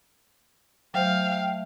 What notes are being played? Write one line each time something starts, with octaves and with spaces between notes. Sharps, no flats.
F#3 A3 C5 E5 F5 G5 F6